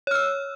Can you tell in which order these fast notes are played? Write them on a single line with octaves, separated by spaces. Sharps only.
C#5 F6 E6